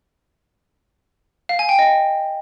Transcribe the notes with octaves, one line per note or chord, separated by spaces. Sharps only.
F5
G#5
G5
D#5